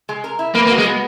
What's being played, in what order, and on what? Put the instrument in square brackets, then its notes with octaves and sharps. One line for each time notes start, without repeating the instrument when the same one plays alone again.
[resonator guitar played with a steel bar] G#3
A#4
E4
[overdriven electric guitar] A#3 [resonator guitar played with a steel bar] B4
[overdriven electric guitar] A#3
[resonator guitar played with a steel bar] F#4
[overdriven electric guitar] G#3
[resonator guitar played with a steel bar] B3